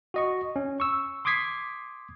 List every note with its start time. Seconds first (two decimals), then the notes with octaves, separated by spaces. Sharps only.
0.14 F#4 D#5 C#6
0.56 C#4
0.80 C#6 E6
1.25 C6 D6 D#6 G#6 B6 C7